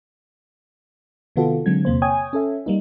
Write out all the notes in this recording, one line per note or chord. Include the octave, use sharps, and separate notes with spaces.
C3 D#3 B3 F4 F#4 A4
D3 F#3 G#3 C4 G#6
E2 C3 A#3 C5
C#5 G5 G#5 D#6 G#6
C#4 A4 E5
G3 A#3 D#4